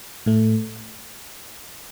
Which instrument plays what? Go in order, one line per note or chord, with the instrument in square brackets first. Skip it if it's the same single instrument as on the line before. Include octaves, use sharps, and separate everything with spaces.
[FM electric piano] A2 A3